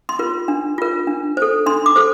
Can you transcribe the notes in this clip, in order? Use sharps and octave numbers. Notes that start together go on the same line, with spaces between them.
C6
F4 A#4
D4
F4 A#4
D4
A4 C5
D4 C6
D6
A4 C5